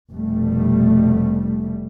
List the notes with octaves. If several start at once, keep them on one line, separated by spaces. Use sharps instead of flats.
F1 B2 G3 A3